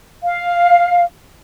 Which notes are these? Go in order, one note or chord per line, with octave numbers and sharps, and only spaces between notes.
F5